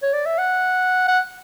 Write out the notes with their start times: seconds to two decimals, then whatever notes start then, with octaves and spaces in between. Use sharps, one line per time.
0.02 C#5
0.13 D5
0.26 E5
0.38 F#5
1.08 F#5